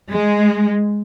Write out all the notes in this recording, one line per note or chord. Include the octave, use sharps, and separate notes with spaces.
G#3